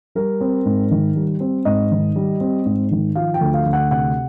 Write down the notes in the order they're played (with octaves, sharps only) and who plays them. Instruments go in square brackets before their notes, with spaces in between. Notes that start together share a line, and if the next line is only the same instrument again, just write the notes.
[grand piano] G3 A#4
C4
G#2
D#3
G3
C4
G#2 D#5
D#3
G3
C4
G#2
D#3
F3 F5
G5
D2
F5
D2
F#5
C3 F#5